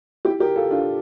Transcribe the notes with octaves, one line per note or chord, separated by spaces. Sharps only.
E4 G4
G4 A#4
F4 A4
D4 F4